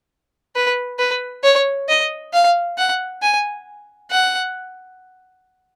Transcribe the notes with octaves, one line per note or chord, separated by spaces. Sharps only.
B4
B4
C#5
D#5
F5
F#5
G#5
F#5